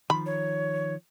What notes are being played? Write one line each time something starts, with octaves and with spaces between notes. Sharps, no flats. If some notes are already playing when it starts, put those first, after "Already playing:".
D#3 F3 B5
C#5